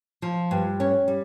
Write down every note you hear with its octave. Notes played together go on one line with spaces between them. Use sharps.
F3
G2
C#4
G3